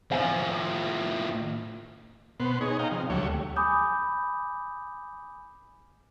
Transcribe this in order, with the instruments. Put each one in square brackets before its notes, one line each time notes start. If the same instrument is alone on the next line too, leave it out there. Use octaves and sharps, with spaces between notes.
[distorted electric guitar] A2 F3 [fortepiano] C5 F5 G#5
[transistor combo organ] B2 B3 C5
D#4 G#4 C#5
D#5 F5 G5 A#5
C3 F3
D2 F#3 G3 A3 C#5
[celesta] G#5 B5 D6 D#6 G6